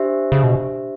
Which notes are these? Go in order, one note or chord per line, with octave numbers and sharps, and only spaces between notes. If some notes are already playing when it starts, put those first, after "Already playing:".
Already playing: D4 G4 C5 E5
C#3
B2